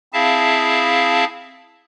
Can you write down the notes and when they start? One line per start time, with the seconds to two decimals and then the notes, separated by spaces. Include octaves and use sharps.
0.13 C4 E4 G#4 E5 F5 A5